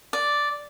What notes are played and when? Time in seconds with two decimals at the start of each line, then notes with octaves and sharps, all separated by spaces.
0.13 D5